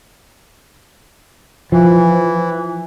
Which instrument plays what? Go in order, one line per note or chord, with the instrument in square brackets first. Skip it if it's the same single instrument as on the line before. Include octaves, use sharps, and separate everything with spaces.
[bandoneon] E3 [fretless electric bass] F3